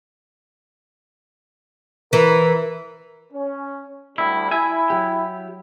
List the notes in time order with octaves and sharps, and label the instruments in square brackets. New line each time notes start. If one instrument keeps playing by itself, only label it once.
[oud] E3 [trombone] A#4
[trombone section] C#4
[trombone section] D2 G3 [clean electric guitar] E4
[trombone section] E4 [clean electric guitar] E5 G#5
[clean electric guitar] F#3 G4